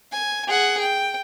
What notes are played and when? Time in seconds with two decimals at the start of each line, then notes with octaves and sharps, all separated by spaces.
0.12 G#5
0.47 G#4 F#5
0.80 G5